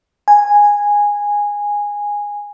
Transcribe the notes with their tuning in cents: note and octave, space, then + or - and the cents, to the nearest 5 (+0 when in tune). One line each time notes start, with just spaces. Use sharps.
G#5 -10